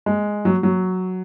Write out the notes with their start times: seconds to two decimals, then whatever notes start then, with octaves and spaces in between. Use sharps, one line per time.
0.06 G#3
0.45 F#3
0.63 F#3